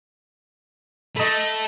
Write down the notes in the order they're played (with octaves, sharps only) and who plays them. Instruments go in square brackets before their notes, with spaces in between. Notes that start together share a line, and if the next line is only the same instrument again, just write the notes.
[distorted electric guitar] A3 [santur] D#5 B5